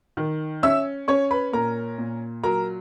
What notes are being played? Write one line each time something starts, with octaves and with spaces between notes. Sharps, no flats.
D#3
C#4 E5 E6
C#4 C#5 C#6
B4 B5
A#2 A#4 A#5
A#2
F#3 A#4 A#5